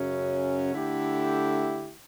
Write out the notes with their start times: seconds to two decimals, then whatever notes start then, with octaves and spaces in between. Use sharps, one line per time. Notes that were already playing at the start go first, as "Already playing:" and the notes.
Already playing: F#2 C#3 F#3 C#4
0.74 D3 A3 E4 G4